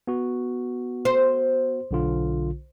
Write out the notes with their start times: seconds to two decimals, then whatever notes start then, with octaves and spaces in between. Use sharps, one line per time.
0.08 B3 F#4
1.05 C5
1.91 B1 D3 F4